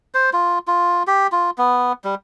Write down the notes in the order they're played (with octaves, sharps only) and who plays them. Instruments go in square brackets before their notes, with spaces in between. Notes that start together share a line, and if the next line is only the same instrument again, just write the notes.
[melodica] C5
F4
F4
G4
F4
B3
G3